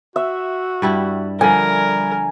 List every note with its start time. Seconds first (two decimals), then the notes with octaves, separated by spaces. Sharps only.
0.16 F#4 E5
0.82 G2 G3 E4
1.41 D3 F3 G3 A#4 G#5